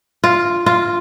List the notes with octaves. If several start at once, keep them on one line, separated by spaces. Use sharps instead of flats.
F4
F4